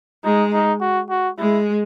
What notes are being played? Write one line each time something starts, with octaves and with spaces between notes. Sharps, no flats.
G#3 D#4
D#4
F#4
F#4
G#3 E4